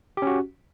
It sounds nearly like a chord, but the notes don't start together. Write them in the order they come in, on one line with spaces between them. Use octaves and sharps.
G4 C#4 F#4